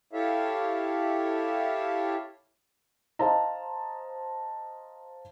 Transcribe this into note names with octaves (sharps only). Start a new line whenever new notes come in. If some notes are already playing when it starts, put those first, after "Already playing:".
E4 G4 A4 C#5 E5 F5
C5 D#5 F5 A5 A#5